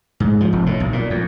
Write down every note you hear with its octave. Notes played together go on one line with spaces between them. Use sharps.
G#2
F3
F1
A2
B1
A#2
F2